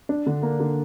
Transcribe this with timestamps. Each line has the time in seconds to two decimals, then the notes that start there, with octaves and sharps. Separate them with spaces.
0.09 D4
0.26 D3
0.43 A#3
0.60 D3